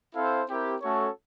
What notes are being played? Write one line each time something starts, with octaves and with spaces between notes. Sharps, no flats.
C4 E4 A4 C5 F5
C4 E4 G4 A#4
A3 C#4 F#4 A4 C#5